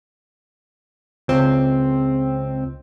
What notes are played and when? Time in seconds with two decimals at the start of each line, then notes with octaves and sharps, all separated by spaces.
1.28 C#2 C4